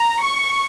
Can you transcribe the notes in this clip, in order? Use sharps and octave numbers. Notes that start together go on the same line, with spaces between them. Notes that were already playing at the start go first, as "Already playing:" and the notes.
Already playing: A#5
C#6